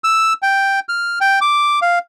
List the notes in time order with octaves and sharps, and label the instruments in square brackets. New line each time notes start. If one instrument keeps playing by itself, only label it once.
[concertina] E6
G5
F6
G5
D6
F5